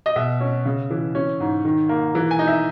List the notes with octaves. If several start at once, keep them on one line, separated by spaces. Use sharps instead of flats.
D#5
B2 E5
C#4
C#3
E3
C#4
G#2
D#3
A#3
E3
G#5
D#4
E5